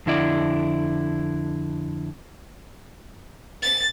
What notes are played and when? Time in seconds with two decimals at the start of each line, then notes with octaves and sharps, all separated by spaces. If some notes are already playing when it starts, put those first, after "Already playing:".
0.06 F2 D3 E4 D5
3.63 A6